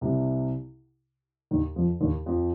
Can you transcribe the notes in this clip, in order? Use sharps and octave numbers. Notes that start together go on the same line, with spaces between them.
C2 C3
D#2 D#3
F2 F3
D#2 D#3
F2 F3